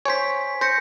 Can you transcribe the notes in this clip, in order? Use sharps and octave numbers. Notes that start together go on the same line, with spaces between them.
C5 C#5 G#5 B6
C5 G6 A#6 C#7